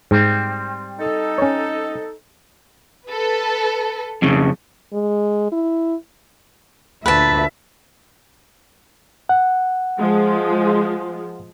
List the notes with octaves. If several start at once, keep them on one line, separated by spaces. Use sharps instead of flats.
G#2 G3 C4
D#4 A4
C#4 C#5
A4 B4
F2 C#3
G#3
E4
D2 A#2 B4 E5 A5
F#5
F3 G#3